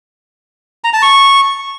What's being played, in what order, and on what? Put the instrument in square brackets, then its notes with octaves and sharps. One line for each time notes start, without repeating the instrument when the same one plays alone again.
[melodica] A#5
A5
C#6